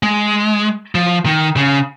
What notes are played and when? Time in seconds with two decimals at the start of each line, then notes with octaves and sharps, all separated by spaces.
0.03 G#3
0.95 F3
1.26 D#3
1.57 C#3